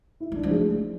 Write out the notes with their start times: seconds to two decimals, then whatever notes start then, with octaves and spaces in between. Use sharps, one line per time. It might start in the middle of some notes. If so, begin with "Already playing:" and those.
0.20 E4
0.32 G#3 D4
0.43 F3
0.51 G#3 A3